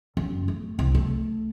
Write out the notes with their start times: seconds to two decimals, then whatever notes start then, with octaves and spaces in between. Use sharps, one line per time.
0.17 F#2
0.48 A3
0.79 C2
0.95 A3